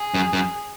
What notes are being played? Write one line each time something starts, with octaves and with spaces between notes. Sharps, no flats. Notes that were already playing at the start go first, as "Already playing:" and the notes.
Already playing: G#4
F#2
F#2